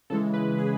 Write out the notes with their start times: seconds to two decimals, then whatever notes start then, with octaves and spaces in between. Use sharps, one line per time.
0.10 C#3 E3 G#3 A4
0.34 B4
0.58 G#4